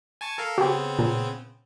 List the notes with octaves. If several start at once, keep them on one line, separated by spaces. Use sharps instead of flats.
G#5 A5 C#6
A4 A#4 F5
C#3 B3 C4 F#4 G4
A#2